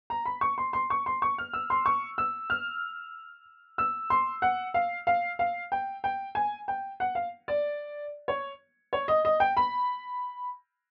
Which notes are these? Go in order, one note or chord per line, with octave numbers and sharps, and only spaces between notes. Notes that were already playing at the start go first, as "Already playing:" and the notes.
A#5
B5
C#6
C6
C6
C#6
C6
C#6
F6
E6
C6
C#6
E6
F6
E6
C6
F#5
F5
F5
F5
G5
G5
G#5
G5
F#5
F5
D5
C#5
C#5
D#5
D#5
G5
B5